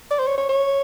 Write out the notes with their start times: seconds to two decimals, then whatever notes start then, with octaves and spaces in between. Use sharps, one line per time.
0.10 D5
0.19 C5
0.27 C#5
0.37 C#5
0.49 C#5